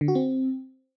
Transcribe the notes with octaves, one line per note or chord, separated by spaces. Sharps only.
D3
F#4
C4